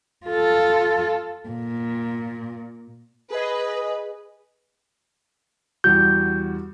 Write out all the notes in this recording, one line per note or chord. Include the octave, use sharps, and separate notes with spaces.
F4 A4
A#2
G#4 B4 D#5
E2 G3 F#4 G6